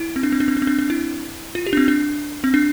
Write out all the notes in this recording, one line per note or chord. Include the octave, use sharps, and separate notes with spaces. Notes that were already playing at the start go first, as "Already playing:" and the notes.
Already playing: E4
C4
D4
C4
D4
C4
D4
C4
D4
D4
E4
F4
G4
D4
C4
D4
C4
D4